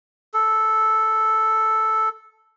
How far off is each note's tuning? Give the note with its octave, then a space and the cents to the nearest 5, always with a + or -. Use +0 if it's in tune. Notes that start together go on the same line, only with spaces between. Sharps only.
A4 -5